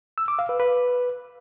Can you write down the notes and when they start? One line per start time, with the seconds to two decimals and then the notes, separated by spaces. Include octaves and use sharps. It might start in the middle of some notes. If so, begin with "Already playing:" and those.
0.18 E6
0.28 D6
0.39 F5
0.49 B4
0.60 B4